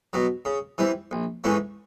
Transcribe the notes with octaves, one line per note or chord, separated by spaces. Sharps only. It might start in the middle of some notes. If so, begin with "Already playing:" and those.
B2 F#3
C#3
E3 G3 C4
A#1
G#2 E3 A3 C#4